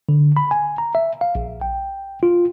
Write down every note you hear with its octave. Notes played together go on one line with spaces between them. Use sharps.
D3
B5
G#5
A#5
E5
F5
A#1
G5
F4